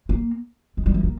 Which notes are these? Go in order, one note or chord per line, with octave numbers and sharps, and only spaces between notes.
A#3
G#3
G3
E3
A#3